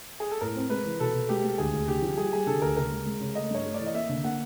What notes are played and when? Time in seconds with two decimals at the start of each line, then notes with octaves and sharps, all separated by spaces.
0.20 G#4
0.31 A4
0.41 A2 A#4
0.56 C4
0.70 G#3 B4
0.85 E3
1.00 B2 A4
1.14 B2
1.29 G#3 G4
1.44 G#3
1.58 D2 G#4
1.73 D2
1.88 D3 G4
2.02 F3
2.17 G3 G#4
2.32 G3 G#4
2.47 D3 A4
2.62 D2 A#4
2.76 C#3 A#4
2.91 G#3
3.06 G#3
3.21 C#3
3.35 A3 D#5
3.51 G2 C#5
3.65 A3
3.74 D5
3.80 E3
3.86 D#5
3.94 A#3 E5
4.09 D3
4.24 A#3 F#5